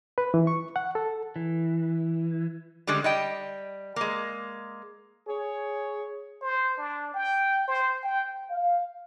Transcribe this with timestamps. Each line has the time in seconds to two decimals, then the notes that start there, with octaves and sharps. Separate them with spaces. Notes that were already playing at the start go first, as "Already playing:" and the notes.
0.18 B4
0.34 E3
0.47 C#6
0.76 F#5
0.95 A4
1.36 E3
2.87 D3 G3 G#3 C#4
3.04 G3 D#5 G5
3.96 G#3 A#3
5.27 G#4 C#5
6.41 C5
6.78 D4
7.14 G5
7.68 C5
8.04 G5
8.51 F5